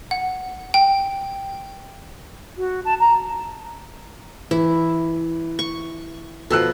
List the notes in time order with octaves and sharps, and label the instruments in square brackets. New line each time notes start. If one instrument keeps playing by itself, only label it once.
[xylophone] F#5
G5
[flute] F#4
A5
A#5
[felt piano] E3 [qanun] E4
[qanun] C#6
[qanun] B2 F3 [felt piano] A4 E6 F#6